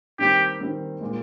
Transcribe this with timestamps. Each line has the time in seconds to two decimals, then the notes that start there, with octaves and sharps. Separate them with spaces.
0.19 D#3 G3 C4 G4
0.61 D#3 G3 C4
1.01 A#2 G#3